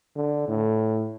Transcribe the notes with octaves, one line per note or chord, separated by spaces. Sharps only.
D3
A2